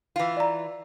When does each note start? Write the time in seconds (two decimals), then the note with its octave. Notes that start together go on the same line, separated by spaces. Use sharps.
0.16 E3 F4
0.37 D5 A#5